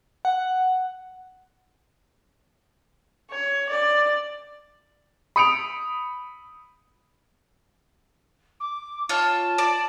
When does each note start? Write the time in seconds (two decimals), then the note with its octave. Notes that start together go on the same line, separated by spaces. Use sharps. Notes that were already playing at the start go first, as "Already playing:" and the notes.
0.25 F#5
3.30 C#5
3.68 D5
5.36 B5 D#6 C#7 D7 F7
8.60 D6
9.09 F4 C#5 A5
9.58 D5